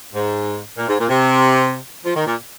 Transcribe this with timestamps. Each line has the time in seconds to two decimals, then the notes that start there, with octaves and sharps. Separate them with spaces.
0.13 G#2
0.77 A#2
0.87 G#2
0.98 A#2
1.09 C3
2.04 F3
2.15 D#3
2.26 A#2